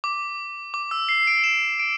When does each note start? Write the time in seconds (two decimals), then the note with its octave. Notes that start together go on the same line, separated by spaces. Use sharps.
0.04 D6
0.74 D6
0.91 E6
1.09 C7
1.27 D7
1.44 E7
1.79 D7